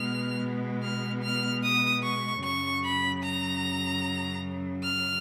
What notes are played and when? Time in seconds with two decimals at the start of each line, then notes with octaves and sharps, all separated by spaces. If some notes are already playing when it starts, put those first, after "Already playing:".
Already playing: B2 G#3 B3 F6
0.82 F6
1.22 F6
1.62 D#6
2.02 C#6
2.42 F#2 C#3 F#3 C#6
2.83 B5
3.22 A#5
4.82 F6